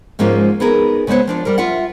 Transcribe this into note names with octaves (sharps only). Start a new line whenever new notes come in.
G#2 F3 G#3 A#3 C#4 F4
B3 D#4 G#4 A#4
C#3 G#3 B3 C5 C#5
F3 D4 F4
G3 A#4
F4 E5 F#5